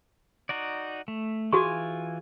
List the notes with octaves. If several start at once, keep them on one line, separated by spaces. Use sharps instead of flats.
D#4 F#4 D5
A3
E3 F4 F#4 G#4 G#5 C#6